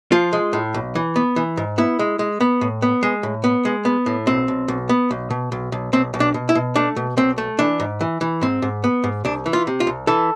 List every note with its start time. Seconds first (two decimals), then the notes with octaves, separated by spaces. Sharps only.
0.12 F3 F4
0.33 G#3
0.53 A2
0.74 B1
0.95 E3
1.16 B3
1.36 E3
1.57 G#2
1.78 B3 E4
1.99 G#3
2.19 G#3
2.41 B3
2.61 A2
2.82 B3
3.03 G#3
3.23 A2
3.44 B3
3.65 G#3
3.85 B3
4.06 A2
4.27 B1 C4
4.48 B1
4.68 B1
4.89 B3
5.11 B1
5.30 B2
5.52 B1
5.72 B1
5.93 B1 C4
6.14 B1
6.20 D4
6.34 B2
6.49 E4
6.55 B2
6.76 A3 D4
6.96 B2
7.17 B1 C4
7.38 A3
7.59 E3 D4
7.80 G#2
8.01 E3
8.21 E3
8.41 G#2 C4
8.62 G#2
8.84 B3
9.04 G#2
9.25 C2 D4
9.46 E3
9.53 F4
9.67 C3
9.80 F4
9.87 C2
10.07 E3 A4